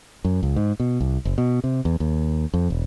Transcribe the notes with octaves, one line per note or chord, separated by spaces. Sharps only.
F#2
C#2
G#2
B2
C2
F#1
B2
C3
E2
D#2
F2
E1